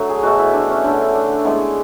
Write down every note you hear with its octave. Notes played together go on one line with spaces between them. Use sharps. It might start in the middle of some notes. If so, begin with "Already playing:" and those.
Already playing: D3 F#3 A3
G#4
B2 A3 F#4
E4
D4
C#4
D3 A3
D4
A2 G#3 B3